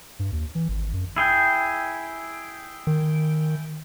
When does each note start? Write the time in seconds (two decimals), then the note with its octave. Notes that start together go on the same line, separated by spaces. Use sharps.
0.19 G2
0.32 D#2
0.55 E3
0.69 G#1
0.93 F#2
1.16 E4 G#4 G5
2.87 D#3